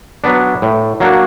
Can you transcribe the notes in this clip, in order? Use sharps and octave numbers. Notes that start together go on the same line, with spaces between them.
F#3 B3 D4
A2
F#3 A#3 D4 F#4